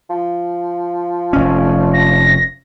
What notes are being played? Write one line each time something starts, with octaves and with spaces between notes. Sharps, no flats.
F3
F1 C#4
A#6